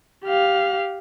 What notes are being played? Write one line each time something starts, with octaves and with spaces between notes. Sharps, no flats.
G4 F5